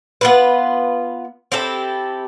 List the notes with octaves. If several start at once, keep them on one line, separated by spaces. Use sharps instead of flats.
B3 F4 B4
C4 E4 G4 A4